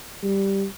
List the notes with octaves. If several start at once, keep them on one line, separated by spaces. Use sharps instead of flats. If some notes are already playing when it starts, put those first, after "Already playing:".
G3